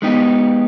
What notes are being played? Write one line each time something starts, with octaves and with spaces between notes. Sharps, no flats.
G#3 B3 D#4 G4